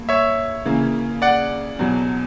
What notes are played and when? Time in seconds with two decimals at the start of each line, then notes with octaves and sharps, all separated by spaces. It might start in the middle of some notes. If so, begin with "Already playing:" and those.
Already playing: G2 A#3
0.09 C#5 E5
0.65 C#3 E3 A#3
1.22 D5 F#5
1.79 E2 B2 F#3